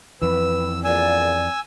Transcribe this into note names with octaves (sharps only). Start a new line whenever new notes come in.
F2 E3 B4 E6
A#1 E2 A#2 D5 G#5 E6